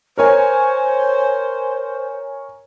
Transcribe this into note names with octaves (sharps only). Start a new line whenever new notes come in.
A#4 C5 C#5 G#5